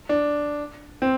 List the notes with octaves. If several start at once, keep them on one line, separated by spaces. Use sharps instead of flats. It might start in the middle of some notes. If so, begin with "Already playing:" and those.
D4
C4